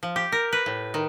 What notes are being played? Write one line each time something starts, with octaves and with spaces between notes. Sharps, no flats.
F3
G4
A#4
B4
A2
D#3